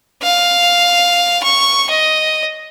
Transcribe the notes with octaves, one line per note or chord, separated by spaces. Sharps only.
F5
C#6
D#5